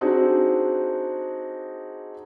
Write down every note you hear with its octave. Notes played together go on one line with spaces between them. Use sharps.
C4 D4 D#4 F#4 G#4